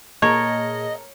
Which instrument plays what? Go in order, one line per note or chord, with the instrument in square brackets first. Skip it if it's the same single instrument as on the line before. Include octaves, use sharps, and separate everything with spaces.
[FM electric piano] A#2 A#3 G#4 [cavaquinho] A#4 A5 [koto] C#5 [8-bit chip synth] D#5